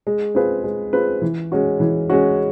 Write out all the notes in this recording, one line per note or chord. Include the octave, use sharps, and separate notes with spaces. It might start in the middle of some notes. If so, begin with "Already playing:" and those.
G#3
C4 F4 G#4 B4
G#3
C4 F4 G#4 B4
E3
G#3 C#4 F#4
E3
G#3 C#4 F#4